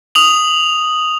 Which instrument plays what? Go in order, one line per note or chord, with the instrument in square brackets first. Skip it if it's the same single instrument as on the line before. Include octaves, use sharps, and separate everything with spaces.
[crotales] D#6 F7 F#7